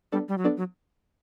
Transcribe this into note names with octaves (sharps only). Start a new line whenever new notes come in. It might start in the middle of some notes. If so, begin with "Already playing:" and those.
G3 B3 D4 A4 D5
G3
F#3
B3 D4 A4 D5
F#3